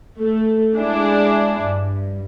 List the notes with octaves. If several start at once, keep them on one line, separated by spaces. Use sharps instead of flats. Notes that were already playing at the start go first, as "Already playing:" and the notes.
A3
G#3 D4 E4 G#4
G2